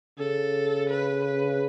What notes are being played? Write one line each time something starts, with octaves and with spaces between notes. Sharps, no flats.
C#3 A4
B4
B4